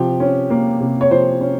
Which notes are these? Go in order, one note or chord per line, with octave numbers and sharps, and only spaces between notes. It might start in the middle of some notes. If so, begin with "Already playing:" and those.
Already playing: C3 F3 G4
C#4
A#3
C3
C#5
F3 C5
C#4